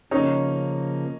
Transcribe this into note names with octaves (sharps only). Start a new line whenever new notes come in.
C#3 F3 A#3 C#4 D#4